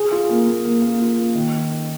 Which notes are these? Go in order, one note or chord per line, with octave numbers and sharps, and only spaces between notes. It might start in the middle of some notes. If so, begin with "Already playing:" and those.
Already playing: G#4
F4
A#3
A#3
A#3
A#3
F4
A#3
D#3
D#4
D#4